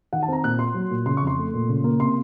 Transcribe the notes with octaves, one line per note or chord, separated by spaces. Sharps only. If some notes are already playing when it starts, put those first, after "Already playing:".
D#3 F#5
A5
C4 A#5
A#2 F#6
A#3 C6
F#3
A#2
C#3 C6
C#6
F2
C6
A3
A#2
C#3
A#3
C3 C6